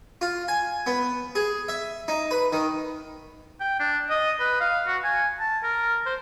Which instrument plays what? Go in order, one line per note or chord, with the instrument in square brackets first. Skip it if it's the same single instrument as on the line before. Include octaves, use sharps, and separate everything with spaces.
[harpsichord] F4
G#5
B3
G#4
E5
D#4
B4
D#3
[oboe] G5
D4
D#5
B4
F5
F#4
G#5
A5
A#4
C5